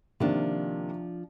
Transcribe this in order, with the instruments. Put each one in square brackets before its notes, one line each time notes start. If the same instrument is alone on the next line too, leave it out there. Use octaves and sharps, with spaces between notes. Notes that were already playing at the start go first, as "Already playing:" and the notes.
[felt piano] C3 D#3 A#3 [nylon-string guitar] F3 D4